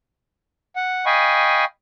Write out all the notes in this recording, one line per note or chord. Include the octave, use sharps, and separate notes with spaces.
F#5
D#5 F5 G5 G#5 B5 C#6